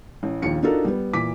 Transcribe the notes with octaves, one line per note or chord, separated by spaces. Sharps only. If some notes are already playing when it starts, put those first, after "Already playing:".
A1
A#1 D#2 F4 C#7
D4 D#4 F4 F#4 A4 A#4
G3 B3
A#2 E3 D6 B6